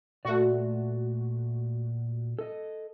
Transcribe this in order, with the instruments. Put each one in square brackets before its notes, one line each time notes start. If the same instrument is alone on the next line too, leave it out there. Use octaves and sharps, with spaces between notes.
[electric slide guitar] A#2 D5 [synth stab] A3 F#4
[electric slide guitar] A4 D#5